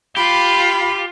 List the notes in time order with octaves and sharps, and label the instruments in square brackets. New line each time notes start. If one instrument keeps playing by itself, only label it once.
[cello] F4 [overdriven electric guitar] G4 [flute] B5